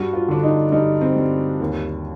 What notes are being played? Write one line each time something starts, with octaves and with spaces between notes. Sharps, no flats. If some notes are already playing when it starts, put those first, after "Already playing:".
Already playing: G2 F#4
F4
D3 D4
D#4
G2 D#4
C4
G2
D#2